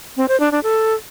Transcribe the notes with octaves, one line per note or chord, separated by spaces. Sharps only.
C4
C5
D4
D4
A4